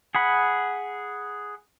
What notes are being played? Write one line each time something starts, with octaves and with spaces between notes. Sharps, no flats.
G#4 F#5 B5